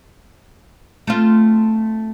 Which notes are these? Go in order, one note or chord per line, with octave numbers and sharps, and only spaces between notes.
A3 C4 F4